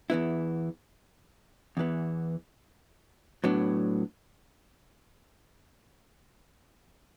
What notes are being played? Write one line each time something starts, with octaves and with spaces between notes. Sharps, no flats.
E2 E3 B3 E4
E2 E3 B3
A2 F#3 B3 D4